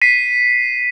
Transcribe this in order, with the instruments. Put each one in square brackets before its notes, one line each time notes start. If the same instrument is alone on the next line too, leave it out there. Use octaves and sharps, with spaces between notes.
[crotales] B6 C7 D#7